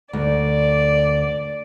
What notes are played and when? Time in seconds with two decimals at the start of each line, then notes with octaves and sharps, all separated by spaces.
0.13 D2 D5